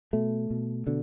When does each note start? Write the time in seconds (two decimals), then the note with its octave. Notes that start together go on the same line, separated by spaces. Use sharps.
0.13 B2 A3
0.51 B2
0.87 B2 D3